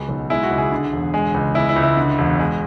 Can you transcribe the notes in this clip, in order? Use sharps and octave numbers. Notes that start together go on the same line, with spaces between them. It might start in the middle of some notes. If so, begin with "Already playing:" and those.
Already playing: C#2 G#3 F#4
B1
G#3 E4
F#4
C#2
G#4
D3
E1
G#3
C#2
G#3 E4
E4
C#2
E4
D3
E1
G#3